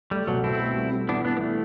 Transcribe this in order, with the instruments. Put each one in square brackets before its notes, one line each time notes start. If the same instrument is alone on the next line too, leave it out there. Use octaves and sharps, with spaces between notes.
[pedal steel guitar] G3 [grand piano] A3
[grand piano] B2 [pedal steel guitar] F#3
[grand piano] B2 [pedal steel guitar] C4 E4
[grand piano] A3
G3
G3
[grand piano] E3 [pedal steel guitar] B3 D4
[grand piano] E3 [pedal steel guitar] B3 D4
[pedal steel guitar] B3
A3